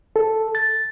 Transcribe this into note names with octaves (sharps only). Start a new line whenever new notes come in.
A4
A6